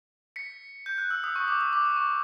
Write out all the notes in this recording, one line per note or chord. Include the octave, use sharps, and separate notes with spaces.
B6 C#7
G6
F#6
E6
D#6
C#6
D6
D#6
D6
D6
C#6